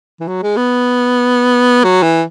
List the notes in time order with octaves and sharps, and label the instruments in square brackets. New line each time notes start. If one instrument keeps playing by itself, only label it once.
[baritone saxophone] E3
F#3
G#3
B3
F#3
E3